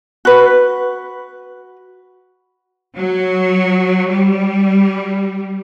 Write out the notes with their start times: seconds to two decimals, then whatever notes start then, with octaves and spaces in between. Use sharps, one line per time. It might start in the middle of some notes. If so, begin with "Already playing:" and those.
0.25 F#4 B4
2.96 F#3
4.10 G3